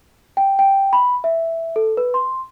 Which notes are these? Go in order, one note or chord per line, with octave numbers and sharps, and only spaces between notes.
G5
G5
B5
E5
A4
B4
C6